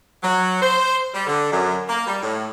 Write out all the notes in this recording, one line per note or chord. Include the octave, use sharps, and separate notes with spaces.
F#3
C5
G3
D3
F#2
A#3
G3
A2